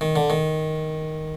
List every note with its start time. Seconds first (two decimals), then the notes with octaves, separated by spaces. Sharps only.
0.01 D#3
0.16 D3
0.30 D#3